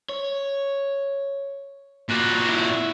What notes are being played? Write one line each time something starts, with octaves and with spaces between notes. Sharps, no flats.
C#5
A#2 F#4
E4